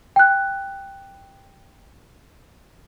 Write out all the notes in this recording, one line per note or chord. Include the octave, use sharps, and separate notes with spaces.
G5 F#6